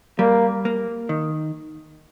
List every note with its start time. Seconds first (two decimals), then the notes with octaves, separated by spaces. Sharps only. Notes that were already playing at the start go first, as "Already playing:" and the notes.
0.19 G3 A#3
0.65 A#3
1.09 D#3